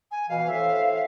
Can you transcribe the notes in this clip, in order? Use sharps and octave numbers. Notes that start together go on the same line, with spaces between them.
G#5
B2 E3 F5
A2 C4 E5